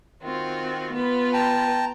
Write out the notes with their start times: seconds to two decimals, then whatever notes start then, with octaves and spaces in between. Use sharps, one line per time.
0.22 D#3 C4 F4 F#4
0.92 B3 F4 B4
1.33 G5 A5 A#5